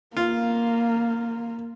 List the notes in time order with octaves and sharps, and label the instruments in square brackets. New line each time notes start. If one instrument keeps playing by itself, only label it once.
[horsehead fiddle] A#3 [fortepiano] F4